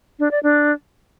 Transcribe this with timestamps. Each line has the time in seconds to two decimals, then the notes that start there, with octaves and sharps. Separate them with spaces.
0.19 D4
0.31 D5
0.43 D4